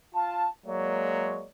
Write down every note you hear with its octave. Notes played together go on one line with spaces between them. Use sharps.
F4 A5
F#3 G#3 A#3 C#5 D5